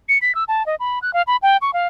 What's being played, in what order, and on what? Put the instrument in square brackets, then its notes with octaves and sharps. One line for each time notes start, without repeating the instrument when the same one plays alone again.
[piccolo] C#7
B6
E6
A5
D#5
B5
F#6
F5
B5
G5
C#6
F5